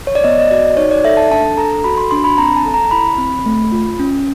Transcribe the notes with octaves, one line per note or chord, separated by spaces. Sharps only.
C#5
D5
B3 D#5
D#5
F#4 D5
D#4 C#5
D5
A4 E5
A5
D4 A5
A4 A#5
F#4 B5
C6
D4 C6
B5
C4 A#5
A5
A4
A#5
E4 B5
C4
A3
F4
C#4